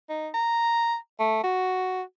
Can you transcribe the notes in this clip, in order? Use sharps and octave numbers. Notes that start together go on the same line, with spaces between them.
D#4
A#5
A3
F#4